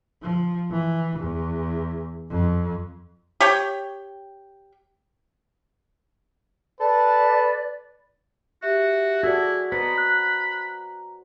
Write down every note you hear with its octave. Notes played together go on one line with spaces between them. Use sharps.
F3
E3
E2
F2
G4 C#5 G5
A4 B4 D5
F#4 G4 E5
E4 F#4 G#4 A4 D5
B3 B4 C5 D#5 A#5 B5
F#6